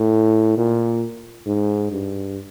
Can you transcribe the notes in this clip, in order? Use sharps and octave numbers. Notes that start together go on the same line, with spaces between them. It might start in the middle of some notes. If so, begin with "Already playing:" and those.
Already playing: A2
A#2
G#2
G2